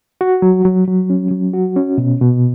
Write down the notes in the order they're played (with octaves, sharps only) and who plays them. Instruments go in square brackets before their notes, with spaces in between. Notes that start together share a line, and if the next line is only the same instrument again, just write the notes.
[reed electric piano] F#4
F#3
F#3
F#3
C#4
F#3
F#4
C#4
B2
B2